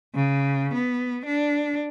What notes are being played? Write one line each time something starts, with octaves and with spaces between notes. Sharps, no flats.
C#3
B3
D4